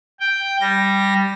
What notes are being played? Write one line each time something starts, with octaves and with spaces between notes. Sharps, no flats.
G5
G3 A#6